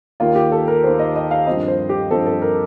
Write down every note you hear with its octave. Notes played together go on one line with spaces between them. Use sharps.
D#2 D#3 A#3 F4
G4
A4
A#4
D#2 D#3 A#3 C5
D#5
D#5
F5
G2 F3 C4 D#5
C5
G4
G2 F3 C4 A4
A4
A#4